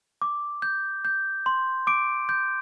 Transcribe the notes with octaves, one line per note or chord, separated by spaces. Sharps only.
D6
G6
G6
C6
D6 D7
G6